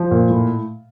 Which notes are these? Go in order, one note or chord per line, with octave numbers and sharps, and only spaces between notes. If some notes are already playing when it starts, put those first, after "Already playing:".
Already playing: F3
A#2
A2